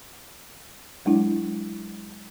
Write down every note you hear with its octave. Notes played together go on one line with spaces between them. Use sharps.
F#3 G#3 D4 E4